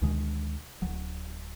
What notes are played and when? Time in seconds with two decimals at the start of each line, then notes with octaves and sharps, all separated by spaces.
0.02 D2 B2 D#3 G#3
0.82 D1 F#3